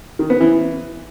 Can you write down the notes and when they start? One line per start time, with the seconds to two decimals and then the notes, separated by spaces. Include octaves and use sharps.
0.19 D#3
0.30 B3
0.41 E3